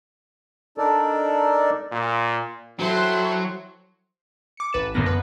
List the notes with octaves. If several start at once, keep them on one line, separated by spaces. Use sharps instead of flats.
D4 D#4 A4 A#4 D5
A#2
F#3 E4 A4 C5 G5 C6
D6 C#7
A1 B4 A6 E7
F#2 D3 F3 A#3 B3 A#6
B4